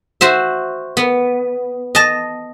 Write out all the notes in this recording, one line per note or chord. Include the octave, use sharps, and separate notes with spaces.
F#4 C5 E5
B3
D#5 A5